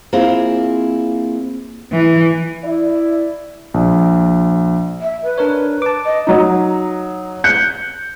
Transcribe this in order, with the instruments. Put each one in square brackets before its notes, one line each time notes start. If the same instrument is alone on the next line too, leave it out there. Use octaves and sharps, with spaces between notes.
[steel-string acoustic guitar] A#3 C4 E4 F4 G#4
[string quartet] E3
[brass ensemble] E4 D5
[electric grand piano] A#1
[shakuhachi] E5
B4
[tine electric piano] D4 A#4 C#5
A5 D6
[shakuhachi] D#5
[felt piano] F#3 D#4
F#6 G6 C#7